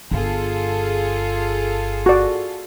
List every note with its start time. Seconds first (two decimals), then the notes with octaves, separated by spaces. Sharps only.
0.11 G1 F4 G#4 A4
2.06 F#4 D5